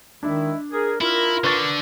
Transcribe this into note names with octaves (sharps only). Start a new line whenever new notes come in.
D#3 G#3 D4 E4 E5
G#4 A#4
E4 F4 A#4
D3 B4 C#6 A6